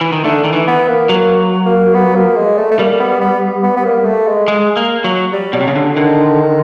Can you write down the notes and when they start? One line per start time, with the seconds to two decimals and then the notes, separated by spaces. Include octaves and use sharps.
0.01 E3
0.13 D#3
0.24 D3 A3
0.44 D#3
0.53 E3
0.68 B3
0.88 A#3
1.09 F#3 A#3
1.66 A#3
1.94 B3
2.15 A#3
2.36 G#3
2.57 A3
2.71 A3
2.79 G3 A#3
3.00 B3
3.21 B3
3.63 B3
3.76 B3
3.84 A#3
4.05 A3
4.27 G#3
4.48 G#3
4.77 A#3
5.04 F#3
5.32 G3
5.53 B2 F#3
5.60 C3
5.67 C#3
5.75 D3
5.96 D3 D#3